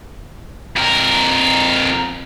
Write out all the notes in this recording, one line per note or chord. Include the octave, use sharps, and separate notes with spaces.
F2 A#4